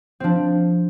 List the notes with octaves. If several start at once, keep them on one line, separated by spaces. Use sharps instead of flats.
F3 C4 D4